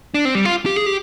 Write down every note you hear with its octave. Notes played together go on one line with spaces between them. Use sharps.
D4
C4
G3
F4
G4
G#4
G4